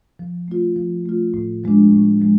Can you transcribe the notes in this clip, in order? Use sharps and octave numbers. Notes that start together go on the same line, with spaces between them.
F3
A3 F4
F3
A3 F4
A2
F3 G#3 D4
A2
F3 G#3